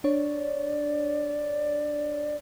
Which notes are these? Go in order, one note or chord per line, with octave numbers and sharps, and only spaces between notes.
D4 C#5 D5